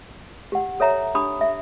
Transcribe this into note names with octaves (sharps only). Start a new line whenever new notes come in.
G4 F#5
A4 C#5 E5 A#5
D4 G4 B5 D#6
E5